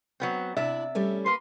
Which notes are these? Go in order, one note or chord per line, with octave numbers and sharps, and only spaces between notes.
F#3 B3 C4
C3 D4 E4 D5 E5
G3 A3 C#4
A#3 B4 C6